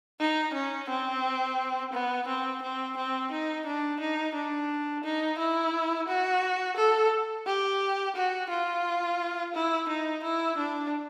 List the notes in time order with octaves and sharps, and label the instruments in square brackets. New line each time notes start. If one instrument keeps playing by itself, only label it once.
[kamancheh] D#4
C#4
C4
B3
C4
C4
C4
D#4
D4
D#4
D4
D#4
E4
F#4
A4
G4
F#4
F4
E4
D#4
E4
D4